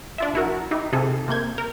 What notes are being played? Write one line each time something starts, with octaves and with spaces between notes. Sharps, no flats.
D4 F4 E5
A#1 E4 F#4 A#4
D#4 E4 G4
C3 F4 G#4 A4
C3 A#3 G6 G#6
A#4